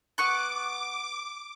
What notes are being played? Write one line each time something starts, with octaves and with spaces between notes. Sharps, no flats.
B3 C#6 D6 F#6